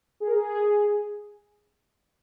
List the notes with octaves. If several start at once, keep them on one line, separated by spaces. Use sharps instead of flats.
G#4
A#4
G#4